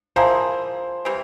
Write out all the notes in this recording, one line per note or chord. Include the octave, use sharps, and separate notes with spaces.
F3 A#3 E4 G#4 C5
E3 G3 C4